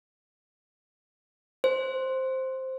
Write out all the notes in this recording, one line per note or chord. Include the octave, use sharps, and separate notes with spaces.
C5